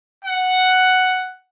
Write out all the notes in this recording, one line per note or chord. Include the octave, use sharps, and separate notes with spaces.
F#5